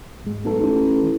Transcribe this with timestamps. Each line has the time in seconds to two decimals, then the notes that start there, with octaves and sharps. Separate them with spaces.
0.24 G#2 G#3
0.45 B1 A3 A4
0.61 A1
1.03 E3